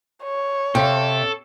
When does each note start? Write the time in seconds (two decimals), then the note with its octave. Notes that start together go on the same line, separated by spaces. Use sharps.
0.24 C#5
0.75 C3 A4 F5 G5